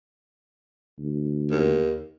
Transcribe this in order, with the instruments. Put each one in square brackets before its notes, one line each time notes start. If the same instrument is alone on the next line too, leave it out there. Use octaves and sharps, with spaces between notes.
[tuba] D2
[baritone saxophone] D#2